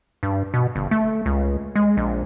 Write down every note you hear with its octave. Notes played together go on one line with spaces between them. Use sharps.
G2
B2
G1
A3
C#2
G#3
A#1